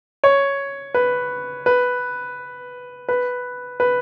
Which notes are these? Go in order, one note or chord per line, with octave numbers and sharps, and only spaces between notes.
C#5
B4
B4
B4
B4